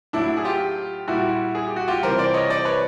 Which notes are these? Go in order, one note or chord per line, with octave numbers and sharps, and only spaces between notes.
A2 F#3 D4 E4
G#4
F4 G4
A#2 G3 E4 F#4
G#4
G4
F#4
F4 G4
C3 E3 G3 A#4 C5
C5 D5
C#5 D#5
C5 D5
B4 C#5